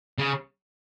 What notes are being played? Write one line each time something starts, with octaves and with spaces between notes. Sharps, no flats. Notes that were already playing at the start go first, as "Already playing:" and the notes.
C#3